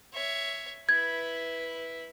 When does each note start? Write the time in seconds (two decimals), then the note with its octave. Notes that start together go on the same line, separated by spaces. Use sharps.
0.13 C#5 E5
0.89 E4 B4 G#6